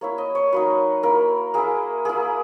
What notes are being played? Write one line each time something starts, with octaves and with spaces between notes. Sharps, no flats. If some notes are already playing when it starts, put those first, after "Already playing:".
A#3 E4 C#5
D#5
C#5
F#3 A#3 D#4 B4
A#3 E4 A#4
A#3 E4 G#4
A#3 E4 G#4